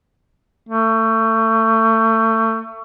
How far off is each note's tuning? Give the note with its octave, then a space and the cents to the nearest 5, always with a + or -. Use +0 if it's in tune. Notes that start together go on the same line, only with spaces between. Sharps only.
A3 +30